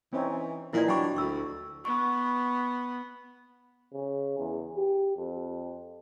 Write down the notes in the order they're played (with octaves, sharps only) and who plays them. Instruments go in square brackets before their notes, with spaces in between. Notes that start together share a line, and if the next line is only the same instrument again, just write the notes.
[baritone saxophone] E3 [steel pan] C4 C#4 D#4
[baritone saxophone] A#2 [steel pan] E3 F3 D#4 [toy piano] E4 D5
[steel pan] F#3 [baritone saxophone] D4 [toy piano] G5 B5 C#6
[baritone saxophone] D2 [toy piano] C#6 E6
[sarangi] B3 [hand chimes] C#6
[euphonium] C#3
E2
G4
F2